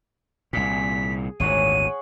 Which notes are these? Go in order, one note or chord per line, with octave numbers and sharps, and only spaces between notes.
C2 A#2 G#4 B6
G#1 D2 A#2 G#4 C#5 F#5 D#7